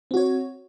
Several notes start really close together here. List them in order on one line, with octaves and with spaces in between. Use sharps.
C4 F#4 C#5